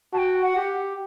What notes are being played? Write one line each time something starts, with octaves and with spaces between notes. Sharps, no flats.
F#4 A5
G5
F#5
G4